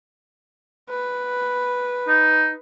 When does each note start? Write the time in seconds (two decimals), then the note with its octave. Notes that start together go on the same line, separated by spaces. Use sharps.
0.90 B4
2.08 D#4